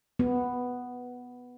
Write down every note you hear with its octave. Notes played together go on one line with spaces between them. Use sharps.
B3